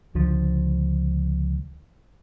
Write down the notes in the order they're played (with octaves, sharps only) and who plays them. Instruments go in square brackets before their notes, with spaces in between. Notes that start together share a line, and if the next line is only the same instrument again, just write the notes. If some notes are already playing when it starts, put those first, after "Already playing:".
[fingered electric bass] C#2 D3 F3